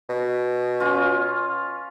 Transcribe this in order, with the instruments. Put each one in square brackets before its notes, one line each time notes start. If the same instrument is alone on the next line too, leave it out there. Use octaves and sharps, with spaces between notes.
[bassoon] B2
[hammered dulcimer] C#4 F4